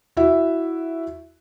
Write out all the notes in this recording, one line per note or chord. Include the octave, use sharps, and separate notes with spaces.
E4 F#4 E5